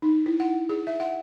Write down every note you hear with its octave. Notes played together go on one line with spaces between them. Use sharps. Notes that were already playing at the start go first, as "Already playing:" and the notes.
D#4
E4
F#5
G#4
E5
F#5